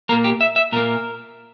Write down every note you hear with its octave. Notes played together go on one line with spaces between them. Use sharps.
A#2 A#3 A#4
G4
E5
E5
A#2 A#3 A#4